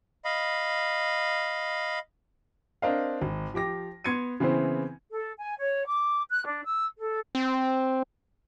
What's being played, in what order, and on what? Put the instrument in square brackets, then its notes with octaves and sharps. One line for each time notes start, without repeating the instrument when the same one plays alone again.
[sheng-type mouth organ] D#5 F5 B5
[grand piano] C4 D4 A#4 C5 D#5 F5
G#1
F3 G4 D6 A#6
B3 C6 G#6 C#7 D#7
C#3 E3 B3 C4 E4 C5
[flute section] A4
G#5
C#5
D6
F#6
D4
E6
A4
[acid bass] C4